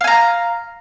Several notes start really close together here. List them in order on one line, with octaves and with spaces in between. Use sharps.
F5 G#5 A#5